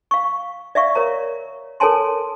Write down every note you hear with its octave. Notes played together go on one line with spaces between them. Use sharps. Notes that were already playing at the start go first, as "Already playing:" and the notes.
F5 C#6
D5 E5 F5 C#6
A#4 C#5 A#5
A4 A#4 C#5 G#5 A5 C6